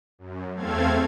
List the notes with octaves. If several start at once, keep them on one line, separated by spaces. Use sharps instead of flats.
F#2
E2 A3 C4 A4 F5 G#6